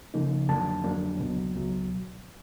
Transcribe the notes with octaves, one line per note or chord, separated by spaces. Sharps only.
C#3 F3 A#3 D#4
F2 D3 F#3 A#3 D4 A5
F2 D3 F#3 A#3 D4
C#2 B2 F#3
C#2 B2 F#3